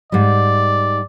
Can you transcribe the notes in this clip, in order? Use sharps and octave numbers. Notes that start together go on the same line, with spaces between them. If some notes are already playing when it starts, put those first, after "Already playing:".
G#2 G3 D5